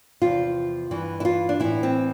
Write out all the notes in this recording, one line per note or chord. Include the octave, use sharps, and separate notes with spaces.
E2 C3 F3 F4
G2 E3
E4
F4
D4
A2 E3 E4
C4